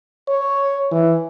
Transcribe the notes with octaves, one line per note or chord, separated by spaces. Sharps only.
C#5
E3